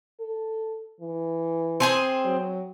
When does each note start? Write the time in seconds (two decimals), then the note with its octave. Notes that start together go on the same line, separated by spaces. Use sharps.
0.20 A4
1.01 E3
1.80 C4 G#4 G#5 C6
2.25 F#3